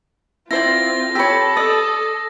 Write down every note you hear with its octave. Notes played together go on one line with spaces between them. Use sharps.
C4 E4 F4 C5 D5 A#6
G4 A4 C#5 B5 E6
D5 D#6 E6